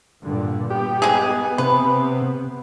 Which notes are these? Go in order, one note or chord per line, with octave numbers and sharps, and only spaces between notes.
G2 A#2 D3
B3 G4
G#3 G#4
C3 B4